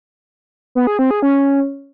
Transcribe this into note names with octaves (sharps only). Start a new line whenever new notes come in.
B3
G#4
C4
G#4
C#4